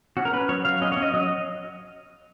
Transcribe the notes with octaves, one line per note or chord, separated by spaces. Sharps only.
C#4 F#4
A#4
C#4 B4
F#3 C#5
F#3 F5
C#4 D#5
C#5
C#4
D#5
F#3 D#5